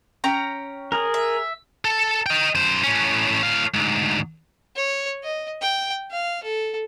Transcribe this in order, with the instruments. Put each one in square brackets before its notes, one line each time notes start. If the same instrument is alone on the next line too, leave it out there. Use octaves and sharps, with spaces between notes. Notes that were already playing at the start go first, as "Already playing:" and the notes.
[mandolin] C#4 G5 A#5
[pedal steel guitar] G#4 A#4
[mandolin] E5
[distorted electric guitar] A4
D#5 G5
F#2 C5
A2 C#4
A2 F5
D2 G#2
[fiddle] C#5
D#5
G5
F5
A4